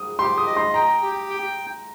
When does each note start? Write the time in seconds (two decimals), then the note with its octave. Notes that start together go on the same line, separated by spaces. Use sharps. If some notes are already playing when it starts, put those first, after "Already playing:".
Already playing: D#6
0.19 G4 C6
0.38 D#6
0.47 D#5
0.57 C6
0.74 G5 A#5
1.02 G4
1.30 G5